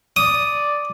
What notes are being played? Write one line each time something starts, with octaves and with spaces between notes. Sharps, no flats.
D5 D#6